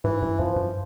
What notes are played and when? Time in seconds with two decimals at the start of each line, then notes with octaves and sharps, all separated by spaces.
0.04 G#2 E3
0.22 G2
0.39 F#2 F3
0.56 G2